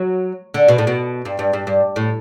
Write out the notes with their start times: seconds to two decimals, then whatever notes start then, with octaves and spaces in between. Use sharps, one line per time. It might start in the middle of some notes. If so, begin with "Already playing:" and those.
Already playing: F#3
0.54 D3
0.68 B2
0.78 A2
0.87 B2
1.25 G2
1.39 G2
1.53 G2
1.67 G2
1.96 A2